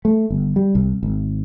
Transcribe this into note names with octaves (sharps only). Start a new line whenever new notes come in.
A3
G1
G3
C2
G#1